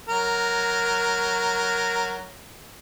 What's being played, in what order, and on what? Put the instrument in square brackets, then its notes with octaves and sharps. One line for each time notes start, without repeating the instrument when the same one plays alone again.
[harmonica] F#3 A#4